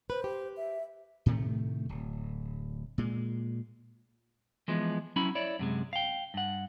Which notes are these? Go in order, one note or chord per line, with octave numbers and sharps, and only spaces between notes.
B4 C5
G4
E5
A2 C3 D#3 A3
D1
A#2 G#3
E3 F3 G#3 B3
F#3 C#4 E4 B5
E4 C#5 D5
F#2 C3 G#3
F5 G5
G2 F#5